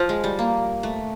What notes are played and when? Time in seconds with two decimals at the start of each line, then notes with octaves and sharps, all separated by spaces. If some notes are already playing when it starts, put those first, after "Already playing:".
Already playing: F3
0.09 G#3
0.24 G3
0.39 A#3
0.83 A3